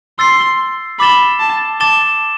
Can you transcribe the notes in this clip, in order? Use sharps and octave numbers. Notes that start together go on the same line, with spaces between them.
C6 E6 A6 C7
B5 D6 A6 E7 G7
A5
A5 D6 A6 E7 G7